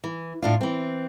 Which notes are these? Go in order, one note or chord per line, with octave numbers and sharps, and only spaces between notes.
E3
A2 D4 F4
E3 C4